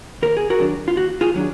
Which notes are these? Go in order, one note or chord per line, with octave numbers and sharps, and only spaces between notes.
D#2 A#4
G#4
F#4 A#4
D#3 F#3 D4
F4
D#2 F#4
F4 G#4
D#3 F#3 D4